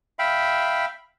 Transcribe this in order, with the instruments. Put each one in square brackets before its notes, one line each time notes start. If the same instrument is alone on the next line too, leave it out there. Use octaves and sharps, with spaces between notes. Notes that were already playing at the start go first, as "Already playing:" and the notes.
[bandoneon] E5 F5 G5 B5